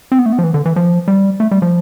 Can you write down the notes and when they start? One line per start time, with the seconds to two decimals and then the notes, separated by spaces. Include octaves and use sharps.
0.12 C4
0.19 B3
0.26 A3
0.33 B3
0.38 F3
0.44 E3
0.54 D3
0.65 E3
0.76 F3
1.08 G3
1.40 A3
1.51 G3
1.62 F3